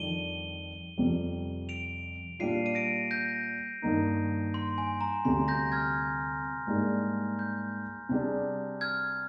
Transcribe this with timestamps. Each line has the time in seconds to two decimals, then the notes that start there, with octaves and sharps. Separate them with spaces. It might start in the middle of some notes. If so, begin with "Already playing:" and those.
Already playing: F2 D#3 G3 D4 D#7 G7
0.98 F2 C3 G3
1.69 D7 F7
2.39 A#2 G3 D4 F4 C7 D#7
2.66 D#7
2.75 A#6 D7
3.11 G6 A#6
3.82 G2 D#3 A#3 D#4
4.54 C6
4.78 G#5
5.01 A#5
5.25 D2 C3 G3 C4 G4 C6
5.48 G6 A#6
5.72 F6 G#6
6.67 G#2 G3 A#3 D4 G#4
7.39 G6
8.09 C3 G3 D4 G#4
8.81 F6 G#6